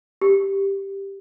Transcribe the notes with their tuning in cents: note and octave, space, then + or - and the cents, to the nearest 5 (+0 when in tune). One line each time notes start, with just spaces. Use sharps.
G4 +0